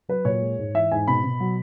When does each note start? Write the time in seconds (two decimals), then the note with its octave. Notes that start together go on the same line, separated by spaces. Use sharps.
0.09 F#3 B4
0.25 A#2 C#5
0.41 G#3
0.58 G#2
0.75 E3 E5
0.91 G#2 G#5
1.07 B2 B5
1.24 B2
1.40 F#3